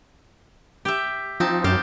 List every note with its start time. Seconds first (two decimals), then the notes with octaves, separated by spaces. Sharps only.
0.85 G4 E5
1.40 F3 C4 D#4 A5
1.64 F#2 G4 F5 A5